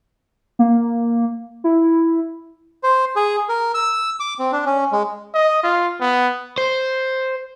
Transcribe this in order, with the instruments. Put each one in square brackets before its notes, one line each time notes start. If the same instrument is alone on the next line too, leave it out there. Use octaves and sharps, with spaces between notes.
[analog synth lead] A#3
E4
[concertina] C5
G#4
A#4
E6
D6
C4
D4
C#4
G#3
[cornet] D#5
F4
B3
[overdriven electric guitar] C5